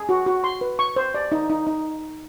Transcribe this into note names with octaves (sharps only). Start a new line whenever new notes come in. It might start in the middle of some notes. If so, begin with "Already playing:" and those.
Already playing: G#4
F#4
F#4
C6
B4
C#6
C5
D5
D#4
D#4
D#4